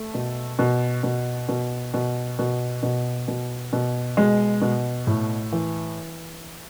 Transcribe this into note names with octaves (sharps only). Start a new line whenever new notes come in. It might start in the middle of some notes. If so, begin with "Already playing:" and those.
Already playing: A3
B2
B2
B2
B2
B2
B2
B2
B2
B2
B2 G#3
B2
A2
E3